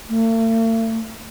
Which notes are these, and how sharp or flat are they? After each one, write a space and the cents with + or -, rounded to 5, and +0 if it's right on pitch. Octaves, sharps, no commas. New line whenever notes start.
A3 +45